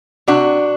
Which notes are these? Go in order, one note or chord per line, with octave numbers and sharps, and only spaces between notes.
C3 D4 F#4